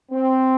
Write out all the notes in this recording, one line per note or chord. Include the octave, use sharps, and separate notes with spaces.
C4